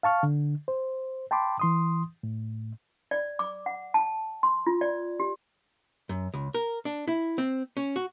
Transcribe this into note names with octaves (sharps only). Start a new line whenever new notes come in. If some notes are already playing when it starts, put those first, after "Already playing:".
F5 A5 C#6 F6
D3
C5
G5 A5 B5 C6 D6
E3 C6 D#6
A2
D5
D6
F#5
A5
C6
F4
D5
G4
F#2
C#2
A#4
D4
E4
C4
C#4
F#4